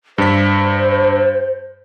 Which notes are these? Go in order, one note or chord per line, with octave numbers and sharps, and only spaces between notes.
G2 C5 B6